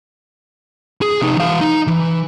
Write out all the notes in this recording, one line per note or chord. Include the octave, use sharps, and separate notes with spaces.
G#4
C3 D#4
E3 F5
D#4
E3